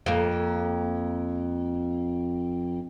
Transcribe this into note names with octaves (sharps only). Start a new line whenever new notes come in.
F2 A#3